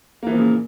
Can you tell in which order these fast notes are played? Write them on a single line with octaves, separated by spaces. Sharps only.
A#3 E3 F3 A#2 C#3